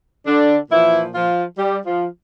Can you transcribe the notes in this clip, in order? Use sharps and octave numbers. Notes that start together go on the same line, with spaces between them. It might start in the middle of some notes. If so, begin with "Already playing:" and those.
D3 D4
A#2 E3 F3 E4
F3 F4
G3 G4
F3 F4